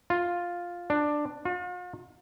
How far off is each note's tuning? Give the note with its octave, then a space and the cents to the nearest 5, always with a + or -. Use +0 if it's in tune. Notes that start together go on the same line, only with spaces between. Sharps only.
F4 +5
D4 +10
F4 +45